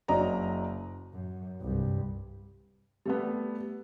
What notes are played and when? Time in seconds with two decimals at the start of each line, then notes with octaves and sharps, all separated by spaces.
0.08 F#1 F#3 D5 D#5 A#5
1.13 F#2
1.60 C2 G2
3.06 G3 A3 B3